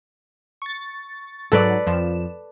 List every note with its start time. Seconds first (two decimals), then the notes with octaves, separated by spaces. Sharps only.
0.62 C#6 A6
1.52 G#2 F#3 A4 B4 D5
1.87 F2 F3 E7